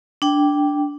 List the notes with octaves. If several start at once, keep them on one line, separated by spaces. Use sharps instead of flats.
D4 G5